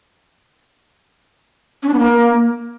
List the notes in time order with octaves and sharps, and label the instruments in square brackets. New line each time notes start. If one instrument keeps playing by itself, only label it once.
[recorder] C#4
D4
B3
A#3